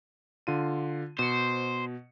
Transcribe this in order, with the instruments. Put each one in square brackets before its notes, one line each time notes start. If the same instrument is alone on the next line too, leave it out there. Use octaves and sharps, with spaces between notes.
[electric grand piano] D3 F4 D#7
[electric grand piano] B2 C#7 [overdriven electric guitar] C5